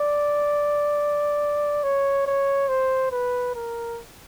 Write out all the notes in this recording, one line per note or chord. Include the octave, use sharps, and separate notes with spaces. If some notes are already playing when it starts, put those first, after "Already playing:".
Already playing: D5
C#5
C#5
C5
B4
A#4